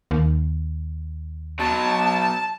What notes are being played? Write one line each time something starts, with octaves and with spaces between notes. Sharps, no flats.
D#2
B2 F#3 A5